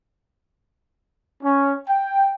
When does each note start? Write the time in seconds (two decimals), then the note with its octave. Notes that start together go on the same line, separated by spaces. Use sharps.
1.43 C#4
1.89 G5